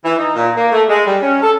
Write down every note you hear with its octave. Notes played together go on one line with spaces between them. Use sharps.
E3
D#4
A#2
A#3
A3
G#3
G3
C#4
A4